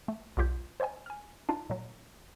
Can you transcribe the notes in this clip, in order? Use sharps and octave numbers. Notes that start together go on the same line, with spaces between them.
A3
B1 E2 F4 G4 G6
C5 C#5 D#5 G5 G#5
G#5 F6
D4 D#4 F4
A#2 F#3